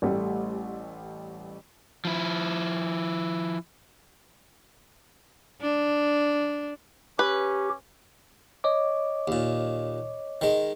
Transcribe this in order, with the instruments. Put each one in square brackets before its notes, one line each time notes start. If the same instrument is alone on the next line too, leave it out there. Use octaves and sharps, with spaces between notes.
[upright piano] A1 G3 A3
[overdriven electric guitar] F3 E4
[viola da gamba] D4
[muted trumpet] C#4 [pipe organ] G4 [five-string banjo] B4
[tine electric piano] C#5 D#5 D6
[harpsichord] D#2 A#2
D#3 G#3